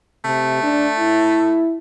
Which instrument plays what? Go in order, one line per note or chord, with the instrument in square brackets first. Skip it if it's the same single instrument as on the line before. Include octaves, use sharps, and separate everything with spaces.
[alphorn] C3 [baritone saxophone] A3
[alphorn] D4
E4